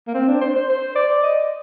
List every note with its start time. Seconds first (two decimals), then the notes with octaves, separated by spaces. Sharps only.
0.08 A#3
0.15 C4
0.28 D4
0.41 C5
0.56 C5
0.69 C5
0.96 D5
1.23 D#5